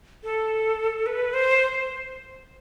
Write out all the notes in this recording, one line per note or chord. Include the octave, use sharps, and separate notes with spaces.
A4
B4
C5